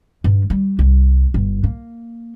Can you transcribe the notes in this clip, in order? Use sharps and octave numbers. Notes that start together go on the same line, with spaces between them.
G2
G3
C2
G1
A#3